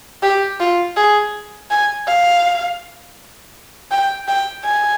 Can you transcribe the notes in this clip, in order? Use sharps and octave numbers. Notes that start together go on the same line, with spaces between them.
G4
F4
G#4
G#5
F5
G5
G5
G#5